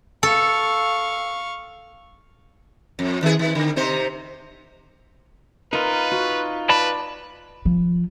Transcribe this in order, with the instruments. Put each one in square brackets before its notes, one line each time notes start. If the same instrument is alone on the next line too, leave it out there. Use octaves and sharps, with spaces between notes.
[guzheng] A4 [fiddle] F5 C#6
[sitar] F2
D#3 G#4
D#3
D3
C3 D#4 C5
[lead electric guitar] D#4 F4 [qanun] A#4 [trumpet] B4
[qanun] F#4
[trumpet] B4 [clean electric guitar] D5 A5 B5
[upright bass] F3